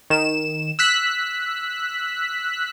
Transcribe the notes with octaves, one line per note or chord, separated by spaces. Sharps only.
D#3 E7
E6 F#6 B6